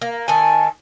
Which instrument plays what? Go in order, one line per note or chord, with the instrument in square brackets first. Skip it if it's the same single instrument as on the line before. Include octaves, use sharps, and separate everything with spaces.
[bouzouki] A#3
[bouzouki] D#3 G#5 [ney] A5